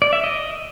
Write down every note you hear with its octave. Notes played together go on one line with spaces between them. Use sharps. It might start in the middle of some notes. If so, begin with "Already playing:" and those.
D5
E5
D#5